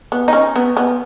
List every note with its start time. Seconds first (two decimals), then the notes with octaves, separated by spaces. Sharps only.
0.12 B3
0.28 D#4
0.33 C#4
0.56 B3
0.77 B3